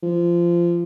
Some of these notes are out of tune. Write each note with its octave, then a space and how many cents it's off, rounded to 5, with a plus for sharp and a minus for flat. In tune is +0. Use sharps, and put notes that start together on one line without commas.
F3 -20